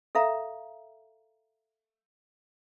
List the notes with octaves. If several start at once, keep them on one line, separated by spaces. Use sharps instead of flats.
A4 E5 F5 A#5